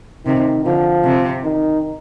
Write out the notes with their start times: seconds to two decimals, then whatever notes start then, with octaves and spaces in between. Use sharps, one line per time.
0.26 C3 D#3
0.65 D3 F3
1.04 C3
1.44 D#3